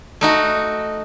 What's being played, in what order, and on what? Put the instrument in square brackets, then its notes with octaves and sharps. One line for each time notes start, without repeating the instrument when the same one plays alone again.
[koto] A3 D#4 F#4